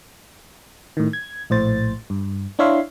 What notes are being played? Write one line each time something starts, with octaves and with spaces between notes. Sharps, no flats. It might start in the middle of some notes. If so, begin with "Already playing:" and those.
A2 D#3
G#6
A#1 A2 C5 A6
G2
D4 E4 C#5 E5 F5 C6